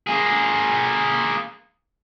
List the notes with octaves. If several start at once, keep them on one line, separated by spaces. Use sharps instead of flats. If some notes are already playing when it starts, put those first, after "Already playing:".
A#3 G#4